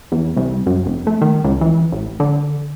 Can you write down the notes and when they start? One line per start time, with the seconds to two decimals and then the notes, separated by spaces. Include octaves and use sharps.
0.12 E2
0.36 C2
0.66 F#2
0.86 F1
1.07 A3
1.21 D#3
1.44 C#2
1.61 E3
1.92 A1
2.20 D3